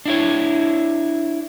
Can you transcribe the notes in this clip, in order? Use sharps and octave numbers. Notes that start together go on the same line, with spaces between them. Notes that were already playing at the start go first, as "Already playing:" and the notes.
D4 E4 C#5